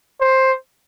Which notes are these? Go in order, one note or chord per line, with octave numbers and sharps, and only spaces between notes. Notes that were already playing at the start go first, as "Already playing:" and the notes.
C5